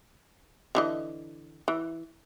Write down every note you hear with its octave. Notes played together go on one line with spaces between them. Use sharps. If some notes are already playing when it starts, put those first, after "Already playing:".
D3 E3 D#5
E3